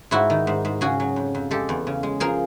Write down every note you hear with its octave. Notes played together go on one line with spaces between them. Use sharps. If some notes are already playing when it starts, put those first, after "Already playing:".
G#2 E4 F#4
D#3
G#2
G#2
C#3 F#4 G#4
F#3
F2
F2
G#3 G4 A4
E2
C#3
G#3
F3 G#4 A#4